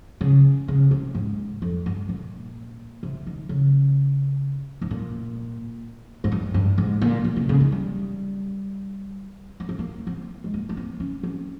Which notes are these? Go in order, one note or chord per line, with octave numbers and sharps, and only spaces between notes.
C#3
C#3
C3
G#2
F2
G2
A#2
C3
D#3
C#3
G#2
A#2
G#2
G2
G2
G#2
A#2
A#2
C3
C#3
D#3
G3
A#3
C4
A#3
C4
G#3
A#3
A#3
C4
C#4
C4